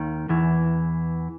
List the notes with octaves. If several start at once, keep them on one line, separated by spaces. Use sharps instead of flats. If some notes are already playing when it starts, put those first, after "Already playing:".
Already playing: D#2 D#3
E2 E3